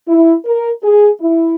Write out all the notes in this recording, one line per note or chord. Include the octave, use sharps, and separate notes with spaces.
E4
A#4
G#4
E4